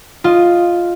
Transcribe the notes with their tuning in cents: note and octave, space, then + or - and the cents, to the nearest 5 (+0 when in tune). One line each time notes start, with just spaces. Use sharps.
F4 +0 D#5 -5